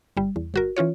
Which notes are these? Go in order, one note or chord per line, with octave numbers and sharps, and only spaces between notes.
G1 G3
E2
G1 F#4 A#4
E3 C#4 F4 C#5